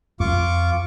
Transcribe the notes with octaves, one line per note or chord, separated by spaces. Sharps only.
F2 F4 C#6 D6